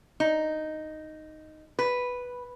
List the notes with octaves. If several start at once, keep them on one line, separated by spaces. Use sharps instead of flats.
D#4
B4